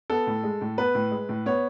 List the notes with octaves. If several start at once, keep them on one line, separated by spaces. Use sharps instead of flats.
B3 A4
A2
G#3
A2
B3 B4
A2
G#3
A2
B3 C#5